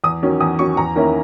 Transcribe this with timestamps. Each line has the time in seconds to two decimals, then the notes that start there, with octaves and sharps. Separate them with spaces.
0.04 E2 D#6
0.23 D#3 F#3 C#4
0.40 E2 D#6
0.59 D#3 F#3 C#4 C#6
0.77 E2 A#5
0.95 D#3 A#3 C#4 E4